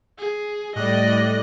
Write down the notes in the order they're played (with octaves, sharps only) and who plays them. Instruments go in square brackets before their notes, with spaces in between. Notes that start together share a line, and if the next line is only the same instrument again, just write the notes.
[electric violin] G#4
[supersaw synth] A2 [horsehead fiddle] G3 D5 [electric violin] D#5 F#6